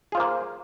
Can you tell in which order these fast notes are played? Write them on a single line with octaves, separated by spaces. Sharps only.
G#4 F4 C5 A#3